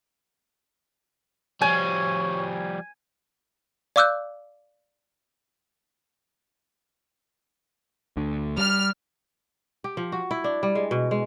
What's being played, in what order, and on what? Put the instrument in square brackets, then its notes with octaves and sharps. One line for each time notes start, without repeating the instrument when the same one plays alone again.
[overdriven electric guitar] F3 G3 [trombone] C#5 [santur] G#5
[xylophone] D5 F5 D6 E6 F#6 G6
[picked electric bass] D2 D3
[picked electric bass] G3 [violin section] F6
[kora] G4
F3
F#4
E4
D4
G3
G#3
B2
G#3